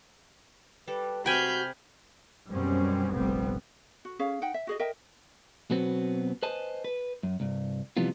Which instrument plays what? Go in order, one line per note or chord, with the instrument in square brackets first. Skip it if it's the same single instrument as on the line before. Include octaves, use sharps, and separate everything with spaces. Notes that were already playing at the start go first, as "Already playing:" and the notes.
[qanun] G3 A4 [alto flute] B4
[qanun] C3 [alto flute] F#4 [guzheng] G5 G#5 [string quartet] B5 F6 G6
[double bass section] F#2 B2 G3 C4 C#4
F1 A#1 G3 B3 C4
[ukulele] F#4
C#4 G#4 C#5 F5
D#4 F#5 G5
E5
F#4 G#4 D#5
A#4 D#5 E5 G5
[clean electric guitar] B2 F#3 B3 C4
B4 C5 D#5 G#5 A5
B4
F#2
C2 G2
C3 E3 F3 G3 B3 F4